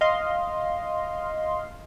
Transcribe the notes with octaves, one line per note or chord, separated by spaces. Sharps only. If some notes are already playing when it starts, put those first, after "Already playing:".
D#5 F5 C6